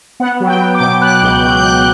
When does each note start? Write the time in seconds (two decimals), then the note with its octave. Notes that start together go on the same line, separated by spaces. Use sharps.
0.20 B3 F#5
0.40 F#3
0.47 G5
0.60 B3
0.75 D6
0.80 B2
1.01 B3 F#6
1.21 C#2 G6
1.42 F#3 G6
1.57 G6
1.62 C#2 F#6